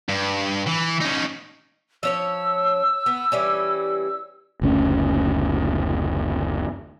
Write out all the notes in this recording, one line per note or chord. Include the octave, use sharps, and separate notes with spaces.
G2
E3
C#4 D#4
F3 C#4 C#5 E6
B3
E3 G3 C#4
F#1 D2 C#4